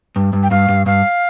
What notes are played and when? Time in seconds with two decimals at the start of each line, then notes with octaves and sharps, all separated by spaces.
0.16 G2
0.33 G2
0.43 G5
0.51 G2 F5
0.69 G2
0.86 G2 F5